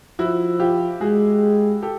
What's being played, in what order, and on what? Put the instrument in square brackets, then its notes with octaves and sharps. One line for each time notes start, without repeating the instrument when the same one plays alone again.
[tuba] F3 [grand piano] E4 F#4
[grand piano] F4 G4
[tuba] G#3 [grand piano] F#4 G#4
[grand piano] G4 A4